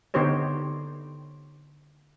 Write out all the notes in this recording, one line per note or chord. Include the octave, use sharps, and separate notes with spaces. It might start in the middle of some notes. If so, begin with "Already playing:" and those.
D3 B3 D#4 G4 C5 C#5